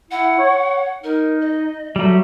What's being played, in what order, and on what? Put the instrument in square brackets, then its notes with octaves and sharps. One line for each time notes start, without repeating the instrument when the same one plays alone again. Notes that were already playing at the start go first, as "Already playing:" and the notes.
[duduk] E4 [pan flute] F#5
[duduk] C#5
[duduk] D#4 [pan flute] A#4
[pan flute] D#5
[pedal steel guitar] F#3 G3 [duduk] A3 [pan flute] E5